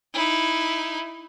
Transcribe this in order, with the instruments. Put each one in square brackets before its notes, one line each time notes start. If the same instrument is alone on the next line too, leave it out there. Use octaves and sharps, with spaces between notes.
[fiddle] D#4 E4